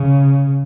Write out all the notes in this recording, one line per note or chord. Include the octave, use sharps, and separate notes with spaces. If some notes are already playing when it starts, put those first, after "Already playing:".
Already playing: C#3